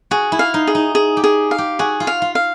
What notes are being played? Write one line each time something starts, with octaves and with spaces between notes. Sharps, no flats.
F#4 G#4
E4
F5
D#4
G#4
D#4
G#4
G4
G#4
F5
G4
F#4 G#4
F4
F5
F4
F5